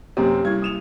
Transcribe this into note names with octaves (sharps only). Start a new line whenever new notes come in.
F#2 C3 A#3 C4 G4
G3 E4 G#6
D#6 E7 F7